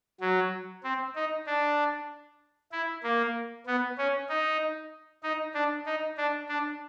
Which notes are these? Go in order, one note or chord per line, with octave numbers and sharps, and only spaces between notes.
F#3
C4
D#4
D4
E4
A#3
B3
C#4
D#4
D#4
D4
D#4
D4
D4